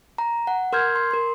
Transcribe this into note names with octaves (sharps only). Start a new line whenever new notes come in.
A#5
F#5
A#4 C6 F6 G6 G#6
C6
A#4 C6